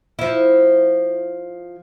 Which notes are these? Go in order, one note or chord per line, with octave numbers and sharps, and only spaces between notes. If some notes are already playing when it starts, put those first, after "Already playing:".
F3 E4